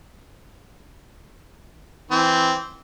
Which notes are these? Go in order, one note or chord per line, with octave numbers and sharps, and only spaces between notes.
E3 C4